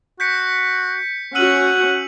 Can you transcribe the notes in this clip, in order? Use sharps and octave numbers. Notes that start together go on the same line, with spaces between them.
F#4 G6 B6 C#7
C#4 F#4 F#5 E6 D#7 F#7